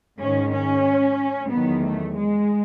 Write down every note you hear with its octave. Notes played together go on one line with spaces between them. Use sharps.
G#2 D#3 G#3 C#4
C#4
E2 D#3 F#3 B3
A3
G#3